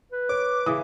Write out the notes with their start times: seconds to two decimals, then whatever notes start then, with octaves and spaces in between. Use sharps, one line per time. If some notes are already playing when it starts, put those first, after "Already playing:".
0.12 B4
0.29 C#5 D6
0.66 C#3 E3 D#6